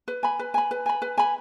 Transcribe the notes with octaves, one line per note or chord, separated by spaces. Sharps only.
B4
G#5 B5
B4
G#5 B5
B4
G#5 B5
B4
G#5 B5